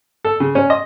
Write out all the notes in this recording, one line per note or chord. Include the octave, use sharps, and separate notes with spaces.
A4
C#3
C#4
D#5